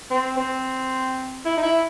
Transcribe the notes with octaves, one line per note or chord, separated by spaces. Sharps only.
C4
C4
E4
D#4
E4